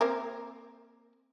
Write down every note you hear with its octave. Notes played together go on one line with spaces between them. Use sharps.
A#3 C4 A#4